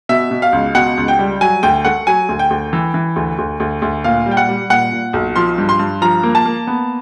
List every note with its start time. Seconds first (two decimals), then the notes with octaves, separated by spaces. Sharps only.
0.09 B2 E5
0.31 B2
0.42 F5
0.53 C#2
0.75 B2 F#5
0.97 C#2
1.08 G5
1.19 G3
1.41 F#3 G#5
1.63 D2 G5
1.85 A3 F#5
2.07 F#3 G#5
2.29 D2
2.39 G5
2.50 D2
2.73 E3
2.94 E3
3.16 D2
3.38 D2
3.60 D2
3.82 D2
4.04 A#2 F5
4.26 G3
4.31 G5
4.37 F#5
4.49 G3
4.70 A#2 F#5
4.92 A#2
5.13 B1
5.36 F3 C6
5.58 G2
5.69 C6
5.79 G2
6.02 F3 A#5
6.23 A#3
6.35 A5
6.45 A#3
6.67 B3